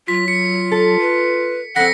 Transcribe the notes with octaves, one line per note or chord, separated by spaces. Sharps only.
F#3 F4 B6
F4 C#7
A4
B4
F2 C4 A4 F#5 A#6 B6 C#7